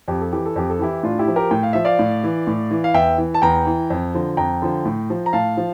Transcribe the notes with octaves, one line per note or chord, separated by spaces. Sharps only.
F2 G4
A4
E3 G4
A4
F2 G4
A4
E3 E4 G4
A2 D4 F4
E4 G4
F3
G4 A#4
A2 G5
F5
F3 E5
D5 F5
A2
E3
A2
E3
F5
E2 E5 G5
E3
A5
E2 G5 A#5
E3
F2
D3 F3
F2 G5 A#5
D3 F3
A2
F3
A#5
A2 F5 A5
F3